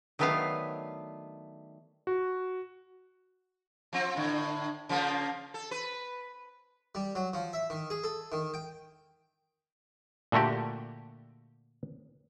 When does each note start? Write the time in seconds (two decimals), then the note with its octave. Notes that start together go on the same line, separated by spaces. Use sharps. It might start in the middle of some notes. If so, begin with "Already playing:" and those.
0.19 D#3 F#3 A3 B3 D4 F5
2.07 F#4
3.93 F3 C4
4.16 A2 D3
4.89 C#3 F3 A#3
5.54 A4
5.71 B4
6.95 G3
7.15 F#3
7.33 F3
7.53 E5
7.70 D#3
7.90 G#4
8.04 A4
8.32 D#3
8.54 G5
10.32 A#2 D3 A3 F#4 G4